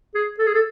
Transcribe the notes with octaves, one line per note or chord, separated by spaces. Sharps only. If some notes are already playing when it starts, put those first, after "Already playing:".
G#4
A4
G#4
A4